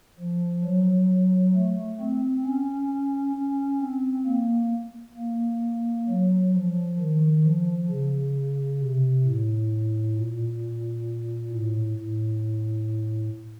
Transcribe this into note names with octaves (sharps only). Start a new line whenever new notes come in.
F3
F#3
A3
C4
C#4
C#4
C4
A#3
A#3
F#3
F3
D#3
F3
C#3
C3
A2
A#2
A2
A2